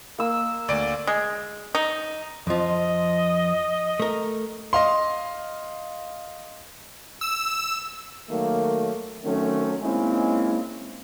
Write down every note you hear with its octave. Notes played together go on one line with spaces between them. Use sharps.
A#3 E6
D2 D5 D7
G#3
D#4
F2 F3 D#5
A3 A#4
D#5 F5 C6
E6
D#3 F#3 A3 A#3
D#3 F#3 A3 C4 C#4
G#3 A#3 C4 C#4 D#4 E4